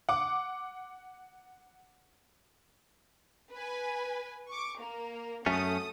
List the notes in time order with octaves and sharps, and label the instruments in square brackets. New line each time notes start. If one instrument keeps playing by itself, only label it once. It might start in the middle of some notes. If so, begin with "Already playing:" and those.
[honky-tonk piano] F#5 D6
[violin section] B4 G#5
C#6 D6
A#3 A#4
[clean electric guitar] F#2 A3 C#4 [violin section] A4 D#6